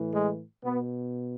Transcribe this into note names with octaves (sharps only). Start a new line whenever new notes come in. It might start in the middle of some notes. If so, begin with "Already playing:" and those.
Already playing: A2 E3
G#3
B2 B3